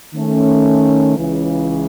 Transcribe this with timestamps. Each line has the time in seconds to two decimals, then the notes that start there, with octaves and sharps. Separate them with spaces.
0.13 D#3 A3 C#4
1.17 C#2 C#3 E3